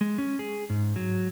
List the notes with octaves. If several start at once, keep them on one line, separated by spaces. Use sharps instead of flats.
G#3
C#4
G#4
G#2
F#3